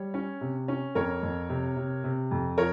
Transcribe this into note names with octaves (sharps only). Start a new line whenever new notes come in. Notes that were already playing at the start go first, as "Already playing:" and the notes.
Already playing: G3 C#5
C#4
C3
C#4
F2 A#4 C#5
F2
C3
C3
C3
F2
F3 A#4 C#5